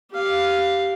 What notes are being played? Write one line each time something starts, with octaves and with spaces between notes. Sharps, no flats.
G4 F5